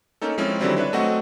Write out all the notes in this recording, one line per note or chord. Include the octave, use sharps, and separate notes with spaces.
A#3 C#4 D#4 A4
F3 G#3 C4 C#4 E4
D3 D#3 F#3 G3 C4 E4
D4 B4 C#5 E5
F#3 A3 C4 F#4 D#5 F#5